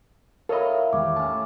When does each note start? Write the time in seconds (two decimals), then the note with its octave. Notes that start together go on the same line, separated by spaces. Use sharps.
0.49 E4 A4 A#4 C#5 D#5 F5
0.93 E2 D#3 G#3 G4 C#5 D6
1.16 A2 C#4 A5